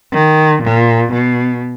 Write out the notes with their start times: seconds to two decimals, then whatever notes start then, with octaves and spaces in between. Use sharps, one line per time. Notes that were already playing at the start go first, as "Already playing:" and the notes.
0.13 D#3
0.63 A#2
1.13 B2